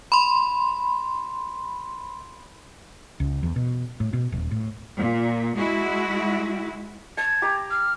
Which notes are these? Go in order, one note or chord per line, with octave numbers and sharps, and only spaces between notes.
B5 C6
C#2
E2
B2
A2
B2
D#1
A2
A#2
G#3 E4 F#4
A5 G#6
G4 A#5
F6